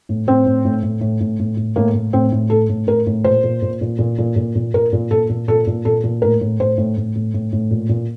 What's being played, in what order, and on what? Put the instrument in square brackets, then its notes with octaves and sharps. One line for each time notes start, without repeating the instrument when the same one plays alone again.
[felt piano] A2
A2 C4
A2
A2
A2
A2
A2
A2
A2
A2 A#3
A2
A2 C4
A2
A2 A4
A2
A2 A#4
A2
A#2 C5
A#2
A#2
A#2
A#2
A#2
A#2
A#2
A#2 A#4
A#2
A#2 A4
A#2
A#2 A4
A#2
A#2 A4
A#2
A2 A#4
A2
A2 C5
A2
A2
A2
A2
A2
A#2
A#2